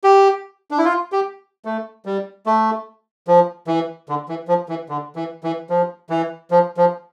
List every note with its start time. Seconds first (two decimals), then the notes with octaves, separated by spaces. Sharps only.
0.04 G4
0.71 D4
0.78 E4
0.85 F4
1.12 G4
1.65 A3
2.05 G3
2.46 A3
3.28 F3
3.67 E3
4.09 D3
4.29 E3
4.48 F3
4.69 E3
4.89 D3
5.16 E3
5.44 E3
5.70 F3
6.10 E3
6.51 F3
6.77 F3